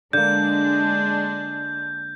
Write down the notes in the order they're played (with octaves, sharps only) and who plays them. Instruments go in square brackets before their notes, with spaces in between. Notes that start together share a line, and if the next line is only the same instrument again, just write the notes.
[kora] D3 A#3 [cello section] G#3 D4 [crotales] G6